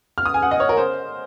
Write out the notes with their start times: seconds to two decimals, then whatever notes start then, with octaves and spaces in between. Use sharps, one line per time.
0.18 F6
0.26 D#6
0.34 G#5
0.42 F#5
0.51 D#5
0.60 C#5
0.69 A#4
0.77 C5